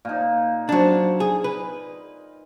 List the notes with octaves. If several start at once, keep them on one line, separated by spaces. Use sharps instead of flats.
A#2 D#4
F#3 D4 C5 F#5
G#4
B4